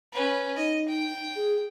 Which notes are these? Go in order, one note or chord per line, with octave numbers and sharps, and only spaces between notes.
C#4 B4
D#4 D#5
G5
G#4